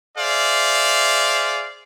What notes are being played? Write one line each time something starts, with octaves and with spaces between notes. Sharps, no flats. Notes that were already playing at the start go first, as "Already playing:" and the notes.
G#4 C5 D5 E5 F5